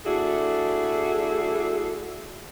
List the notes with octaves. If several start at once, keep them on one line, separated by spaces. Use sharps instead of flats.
A3 D4 E4 F#4 G#4